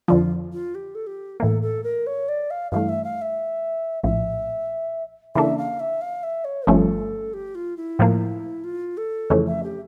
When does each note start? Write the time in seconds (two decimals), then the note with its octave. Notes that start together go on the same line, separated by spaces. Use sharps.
0.08 F2 D3 F3 F4
0.53 F4
0.75 G4
0.95 A4
1.07 G4
1.40 A2 E3 A#3 A4
1.62 A4
1.84 A#4
2.07 C#5
2.29 D5
2.50 F5
2.72 G2 E3 A3 F5
2.89 E5
3.04 F5
3.22 E5
4.03 A#1 A2 F3 E5
5.35 C#3 E3 A#3 D4 A4 E5
5.58 F5
5.80 E5
6.01 F5
6.23 E5
6.45 C#5
6.67 G1 G2 F3 A3 C#4 A4
7.34 G4
7.55 F4
7.77 E4
7.99 A2 F3 A#3
8.64 F4
8.97 A4
9.30 F2 C#3 E3 A3 C#4
9.47 E5
9.63 G4